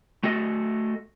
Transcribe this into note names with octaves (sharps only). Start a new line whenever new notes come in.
A3 F#4 A4 D#5